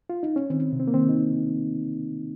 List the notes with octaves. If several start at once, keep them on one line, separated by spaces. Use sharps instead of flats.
F4
D#4
C#4
D#3 C4
C3
C4
A#3
D#3 C4
D#4